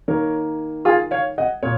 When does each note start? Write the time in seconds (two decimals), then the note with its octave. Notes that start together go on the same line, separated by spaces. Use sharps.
0.08 D#3 A#3 A#4 C#5
0.85 F4 G#4
1.11 C#5 F5
1.38 D#5 F#5
1.63 A#2 C#5